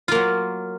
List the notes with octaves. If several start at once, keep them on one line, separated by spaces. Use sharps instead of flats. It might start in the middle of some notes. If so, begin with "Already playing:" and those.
F#3 A#3 F4